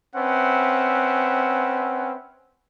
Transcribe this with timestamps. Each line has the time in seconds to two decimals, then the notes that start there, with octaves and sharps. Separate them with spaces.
0.16 C4 C#4 B4 E5 F#5